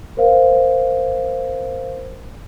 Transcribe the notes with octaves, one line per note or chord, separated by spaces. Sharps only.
A#4 C5 F5